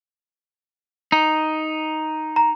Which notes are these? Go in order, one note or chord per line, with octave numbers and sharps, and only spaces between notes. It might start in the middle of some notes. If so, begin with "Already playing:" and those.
D#4
A#5